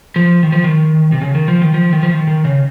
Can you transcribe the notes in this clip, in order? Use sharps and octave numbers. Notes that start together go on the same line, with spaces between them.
F3
D#3
F3
D#3
C3
C#3
D#3
F3
D#3
F3
D#3
F3
D#3
D#3
C#3